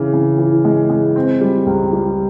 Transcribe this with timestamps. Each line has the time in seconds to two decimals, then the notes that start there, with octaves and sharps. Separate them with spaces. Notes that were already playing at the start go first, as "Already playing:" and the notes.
Already playing: C#3 E3
0.13 C#3
0.38 E3
0.64 G#3
0.90 G#3
1.16 C4
1.41 G3
1.66 C#2
1.93 G3